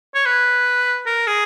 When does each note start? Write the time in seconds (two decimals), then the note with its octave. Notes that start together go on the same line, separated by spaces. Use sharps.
0.15 C#5
0.26 B4
1.06 A#4
1.27 G#4